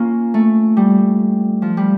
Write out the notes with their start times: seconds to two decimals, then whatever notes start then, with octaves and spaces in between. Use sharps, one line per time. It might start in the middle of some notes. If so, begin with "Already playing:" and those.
Already playing: A#3 C#4 F4
0.34 A3
0.77 G3
1.62 F3
1.77 G3